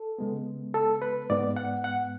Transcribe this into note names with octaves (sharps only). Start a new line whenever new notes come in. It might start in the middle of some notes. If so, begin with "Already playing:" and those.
Already playing: A4
C#3 G#3 B3
A4
B4
G#2 G#3 B3 D5
F#5
F#5